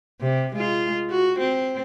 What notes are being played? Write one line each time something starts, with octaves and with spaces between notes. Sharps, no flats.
C3
G#3 F4
F#4
C4